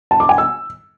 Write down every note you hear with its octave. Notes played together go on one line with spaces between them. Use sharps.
A5
D6
G#5
E6